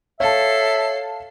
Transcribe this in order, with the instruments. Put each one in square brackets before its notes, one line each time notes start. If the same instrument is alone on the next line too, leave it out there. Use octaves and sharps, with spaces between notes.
[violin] A4 C7 [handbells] C#5 [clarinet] E5 [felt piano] F5 A5